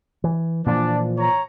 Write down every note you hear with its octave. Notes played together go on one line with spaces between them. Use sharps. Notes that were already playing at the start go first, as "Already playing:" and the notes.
E3
A#2 E3 F3 D4 D5 A5
C#5 A#5